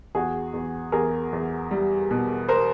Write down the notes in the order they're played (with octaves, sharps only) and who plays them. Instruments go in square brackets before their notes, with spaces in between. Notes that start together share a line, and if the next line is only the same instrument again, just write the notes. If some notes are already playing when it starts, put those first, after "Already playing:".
[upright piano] E2 F#4 G#4
E2
E2 G#4 A#4
E2
G3
B2
A#4 C5